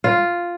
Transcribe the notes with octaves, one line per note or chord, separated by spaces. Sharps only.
F4